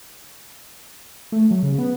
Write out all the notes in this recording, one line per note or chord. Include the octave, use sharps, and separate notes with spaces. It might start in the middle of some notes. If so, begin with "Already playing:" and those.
A3
F#3
C#3
B3